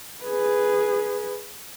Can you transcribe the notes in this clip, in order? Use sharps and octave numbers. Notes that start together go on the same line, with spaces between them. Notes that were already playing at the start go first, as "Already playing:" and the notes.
G#4 B4